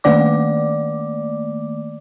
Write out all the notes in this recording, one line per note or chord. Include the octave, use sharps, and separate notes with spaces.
D#3 A3 A#3 D5 D6